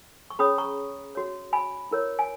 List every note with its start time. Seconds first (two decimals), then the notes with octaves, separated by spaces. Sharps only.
0.30 C#6
0.39 C#4 G#4 C#5 B5 D#6
0.58 A#5 C#6
1.15 F#4 C#5
1.53 G#5 B5
1.91 E4 A#4 C#5
2.19 G#5